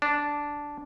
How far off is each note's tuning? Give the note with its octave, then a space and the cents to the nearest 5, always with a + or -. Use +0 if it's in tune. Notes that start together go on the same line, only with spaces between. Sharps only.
D4 -5